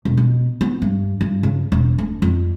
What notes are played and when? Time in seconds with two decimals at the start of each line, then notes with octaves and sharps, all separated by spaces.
0.05 E1
0.17 B2
0.61 B3
0.82 G2
1.21 G2
1.43 C#3
1.72 E1
1.98 D2
2.22 F2